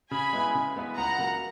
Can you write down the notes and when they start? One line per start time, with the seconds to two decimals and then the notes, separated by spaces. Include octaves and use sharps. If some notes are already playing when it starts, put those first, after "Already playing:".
0.11 C#3 G#5 B5
0.33 G#3 B3 E4 B4
0.55 C#3
0.76 G#3 B3 E4 B4
0.97 C#2 F#5 A#5
1.18 C#3 F#3 A#3